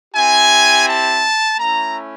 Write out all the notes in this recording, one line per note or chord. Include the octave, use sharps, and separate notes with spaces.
C4 E4 G4 G#5
A5
A3 C#4 E4 A#5